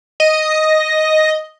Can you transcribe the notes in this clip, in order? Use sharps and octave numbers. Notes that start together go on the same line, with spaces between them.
D#5